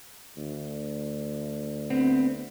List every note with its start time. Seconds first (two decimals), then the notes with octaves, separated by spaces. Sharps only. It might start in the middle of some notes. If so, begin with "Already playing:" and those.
0.37 D2
1.90 B3 C4